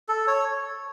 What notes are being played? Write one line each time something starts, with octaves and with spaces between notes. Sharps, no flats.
A4
C#5